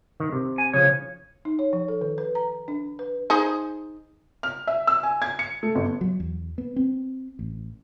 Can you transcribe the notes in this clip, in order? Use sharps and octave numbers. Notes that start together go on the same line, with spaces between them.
D#3
C3
G#5
C#3 F3 C#5
D#4
C#5
F3
A4
D#3
B4
A#5
D4
B4
D#4 G#4 C5
F6
E5
E6
G#5
G#6
C#7
A3
G1
F#3
E2
B3
C4
A1